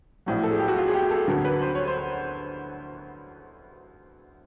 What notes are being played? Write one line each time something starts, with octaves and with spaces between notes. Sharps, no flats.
A#1 A2 F#3
A4
G#4
G4
F#4
F4
G#4
G4
A4
D2 D3 F#3 A#4
B4
C5
C#5
C5